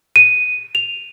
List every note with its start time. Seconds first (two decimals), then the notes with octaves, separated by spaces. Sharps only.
0.16 D#7
0.75 F7